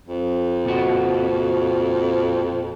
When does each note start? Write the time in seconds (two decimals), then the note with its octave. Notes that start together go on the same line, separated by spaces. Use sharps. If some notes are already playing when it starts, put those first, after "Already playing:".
0.07 F2
0.65 A#2 F#4